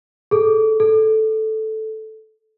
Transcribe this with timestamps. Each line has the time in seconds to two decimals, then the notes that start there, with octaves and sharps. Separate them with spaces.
0.31 G#4 A4
0.80 A4